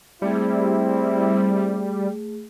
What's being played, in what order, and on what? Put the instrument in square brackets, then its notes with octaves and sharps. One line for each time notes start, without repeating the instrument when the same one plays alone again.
[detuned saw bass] G3 [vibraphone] A3 G#4 [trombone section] C4 E4